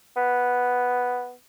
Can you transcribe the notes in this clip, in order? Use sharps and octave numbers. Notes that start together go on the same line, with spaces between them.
B3